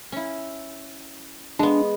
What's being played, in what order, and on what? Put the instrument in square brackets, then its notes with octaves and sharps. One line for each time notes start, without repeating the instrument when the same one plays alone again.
[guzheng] C#4 E4
[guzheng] G#3 B3 [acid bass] D4